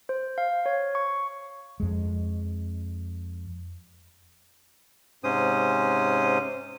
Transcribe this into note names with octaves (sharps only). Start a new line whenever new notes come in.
C5
F5
C#5
C#6
F2 G#3
G#2 C3 C#4 C5 D#6